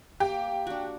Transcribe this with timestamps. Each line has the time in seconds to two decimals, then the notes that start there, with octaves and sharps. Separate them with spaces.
0.20 A#3 G4
0.67 D4 F#4